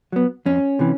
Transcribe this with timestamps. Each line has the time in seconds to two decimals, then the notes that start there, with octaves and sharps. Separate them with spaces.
0.12 F#3 B3
0.46 F2 C#4
0.79 C3 E3